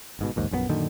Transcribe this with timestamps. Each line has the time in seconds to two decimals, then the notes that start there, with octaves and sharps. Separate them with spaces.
0.19 G1 G#2 B2
0.36 A#1 D#2 G#2
0.51 A#1 F#2 E3 B3
0.69 F#2 A#2 D3 D#3